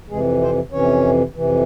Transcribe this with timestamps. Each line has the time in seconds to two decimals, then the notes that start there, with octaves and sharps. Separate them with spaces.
0.10 F2 C3 E3 G#3 G#4
0.41 C4 C5
0.72 F2 C3 E3 C#4 C#5
1.35 F2 C3 E3